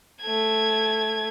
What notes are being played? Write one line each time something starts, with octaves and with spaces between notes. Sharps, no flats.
A3 G#6